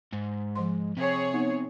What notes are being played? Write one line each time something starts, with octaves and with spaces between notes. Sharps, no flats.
G#2
F3 C5 C6
C3 G#4 C#5
B3 D#4 F#5